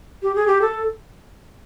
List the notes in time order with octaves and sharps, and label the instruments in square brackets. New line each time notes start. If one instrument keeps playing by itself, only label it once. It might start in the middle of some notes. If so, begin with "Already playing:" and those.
[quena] G4
G#4
G4
A4